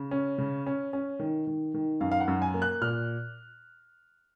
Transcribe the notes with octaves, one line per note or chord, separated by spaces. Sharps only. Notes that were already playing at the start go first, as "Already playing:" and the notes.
Already playing: C#3
C#4
C#3
C#4
C#4
D#3
D#3
D#3
F#2 F5
F5
F#5
F#2
G#5
A#3
F#6
A#2 F6